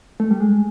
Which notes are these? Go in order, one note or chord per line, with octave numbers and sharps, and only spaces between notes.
A3
G3
G#3